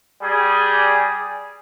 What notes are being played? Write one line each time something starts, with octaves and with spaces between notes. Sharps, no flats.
G3 G#4